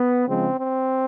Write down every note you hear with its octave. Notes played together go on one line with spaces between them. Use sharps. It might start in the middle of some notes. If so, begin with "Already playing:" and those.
Already playing: B3
C#3 F3 G#3 C4
C4